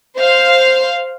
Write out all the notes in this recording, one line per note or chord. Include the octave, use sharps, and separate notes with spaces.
C5 F5